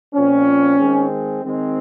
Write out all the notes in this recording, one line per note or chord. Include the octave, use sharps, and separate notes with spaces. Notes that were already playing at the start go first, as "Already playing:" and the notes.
A#2 F3 C4 C#4
D#3 G#3 C4
D#3 G#3 C4